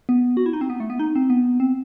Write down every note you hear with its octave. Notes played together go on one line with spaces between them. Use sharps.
B3
F#4
E4
D#4
C4
B3
A3
B3
D#4
C4
B3
C4